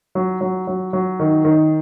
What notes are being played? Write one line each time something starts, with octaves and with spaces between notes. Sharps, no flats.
F#3
F#3
F#3
F#3
D#3
D#3